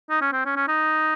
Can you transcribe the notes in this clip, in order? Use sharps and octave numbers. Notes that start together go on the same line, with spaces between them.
D#4
C#4
C4
C#4
C#4
D#4